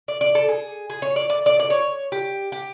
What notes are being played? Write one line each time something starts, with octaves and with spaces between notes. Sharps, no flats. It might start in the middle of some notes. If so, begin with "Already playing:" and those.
D5
D5
A4
G#4
G#4
C#5
D5
D5
D5
D5
C#5
G4
G4